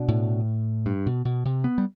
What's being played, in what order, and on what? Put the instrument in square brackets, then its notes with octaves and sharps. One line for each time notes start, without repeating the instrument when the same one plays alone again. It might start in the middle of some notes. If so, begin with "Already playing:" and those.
Already playing: [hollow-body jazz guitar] B2 D4
[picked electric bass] A2
G2
B2
B2
C3
B3
G3